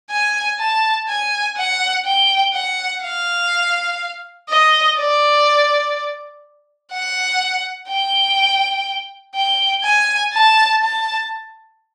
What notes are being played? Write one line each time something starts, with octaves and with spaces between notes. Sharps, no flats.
G#5
A5
G#5
F#5
G5
F#5
F5
D#5
D5
F#5
G5
G5
G#5
A5
A5